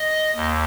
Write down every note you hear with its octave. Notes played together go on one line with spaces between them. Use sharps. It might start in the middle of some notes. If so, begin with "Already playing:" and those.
Already playing: D#5
D#2